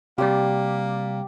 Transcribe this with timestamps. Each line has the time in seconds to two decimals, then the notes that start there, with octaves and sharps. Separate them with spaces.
0.18 C3 G3 A#3 G4 D5